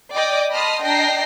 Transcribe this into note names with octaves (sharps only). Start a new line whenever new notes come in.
D5 D#5 G5 D6 D#6
D#5 A5 B5 C6 D#6 F6
D4 D#5 G5 A#5 A#6 C7